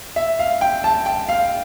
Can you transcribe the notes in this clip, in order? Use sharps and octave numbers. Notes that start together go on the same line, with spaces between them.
E5
F5
G5
A5
G5
F5